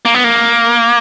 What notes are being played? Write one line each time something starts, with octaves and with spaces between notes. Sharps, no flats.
A#3
B3
A#3